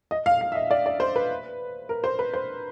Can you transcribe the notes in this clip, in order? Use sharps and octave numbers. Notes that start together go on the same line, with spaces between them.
D#5
F5
F5
E5
D#5
D5
D5
C5
B4
A#4
C5
B4
C5